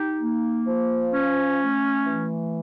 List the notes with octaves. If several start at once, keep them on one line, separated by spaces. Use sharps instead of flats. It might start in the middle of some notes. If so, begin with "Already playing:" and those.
Already playing: D#4 G4
A#3
F3
C#4
A3
E3